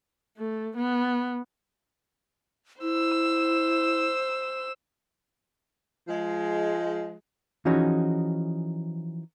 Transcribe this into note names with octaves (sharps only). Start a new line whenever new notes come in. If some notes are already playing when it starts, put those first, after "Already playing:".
A3
B3
E4 C5 E6
F3 G#3
E3 F3 C#4 D#4 F#4 G#4